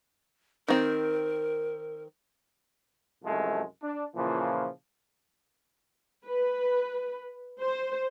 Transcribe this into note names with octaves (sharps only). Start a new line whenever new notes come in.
D#3 C4 A#4
C2 F#2 F3 G#3 A3
D4
A#2 C#3 E3 F3
B4
C5